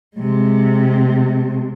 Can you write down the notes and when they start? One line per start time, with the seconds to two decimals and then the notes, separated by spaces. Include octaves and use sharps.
0.17 C3 G#3